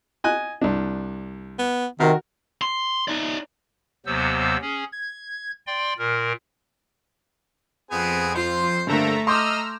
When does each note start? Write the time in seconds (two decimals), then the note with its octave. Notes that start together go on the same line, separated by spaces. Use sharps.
0.24 D#5 G#5 F#6
0.62 C2 D4
1.59 B3
2.00 C3 D#3 F#4 A#4
2.62 C6
3.08 D#4 D5
4.06 D#2 C3 F#3 B3 C5 E6
4.61 C#4 G#4
4.92 G#6
5.67 D5 G5 C6
5.99 A#2 A#4
7.91 F2 B3 C4 G#4
8.35 F4 C5 C6
8.87 G2 D3 A3 A#3 C4 A4 E5 A#5
9.27 D#5 A#5 C6 D6 E6 F6 G6